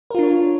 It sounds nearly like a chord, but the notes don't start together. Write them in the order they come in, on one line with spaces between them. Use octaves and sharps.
A#4 F4 D4 C#5